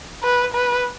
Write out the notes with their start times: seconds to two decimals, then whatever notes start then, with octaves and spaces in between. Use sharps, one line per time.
0.23 B4
0.54 B4